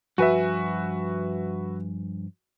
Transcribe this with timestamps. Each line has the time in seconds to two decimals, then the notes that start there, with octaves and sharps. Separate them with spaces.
0.18 G2 F3 F#4 B4 E5 G#5